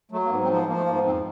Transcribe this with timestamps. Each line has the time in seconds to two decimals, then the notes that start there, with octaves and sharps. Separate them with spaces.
0.11 F#3 A3
0.25 A#3
0.30 G#2 B3
0.43 C4
0.48 F3
0.55 B3
0.68 F3 A#3
0.77 A3
0.86 G#2 A#3
0.95 B3
1.04 F2 C4